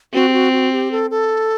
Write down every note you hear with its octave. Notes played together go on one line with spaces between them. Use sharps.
C4 F#4
G4
F#4
F#4
G4
A4
A4